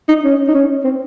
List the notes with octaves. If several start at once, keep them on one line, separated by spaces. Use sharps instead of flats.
D#4
C#4
D#4
C#4
C4